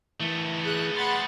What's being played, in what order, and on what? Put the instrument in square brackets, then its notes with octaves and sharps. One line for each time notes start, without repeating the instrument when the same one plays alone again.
[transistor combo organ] E3 [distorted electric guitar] A3 B3
[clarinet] G#4 [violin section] F#6
[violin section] F#5 B5 A6 [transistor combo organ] C6